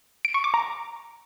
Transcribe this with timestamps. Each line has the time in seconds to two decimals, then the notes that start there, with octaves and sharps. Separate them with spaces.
0.25 D7
0.34 C#6
0.44 D6
0.54 A#5